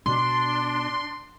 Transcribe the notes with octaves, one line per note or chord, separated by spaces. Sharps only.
B2 D4 C6